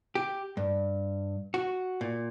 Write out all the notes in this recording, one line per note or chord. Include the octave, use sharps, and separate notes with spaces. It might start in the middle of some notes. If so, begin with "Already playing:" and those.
G4
G2
F#4
A#2